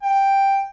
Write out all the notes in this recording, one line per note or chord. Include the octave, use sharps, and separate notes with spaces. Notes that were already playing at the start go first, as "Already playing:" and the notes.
G5